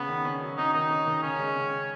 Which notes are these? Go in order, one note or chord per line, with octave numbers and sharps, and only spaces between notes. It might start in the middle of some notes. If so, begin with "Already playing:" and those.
Already playing: C#3 B3 C#4
D#3
C#4
F#3
C#4 D#4
D#3 D#4
C#4
D#3
C#3 C#4
G#3
C#3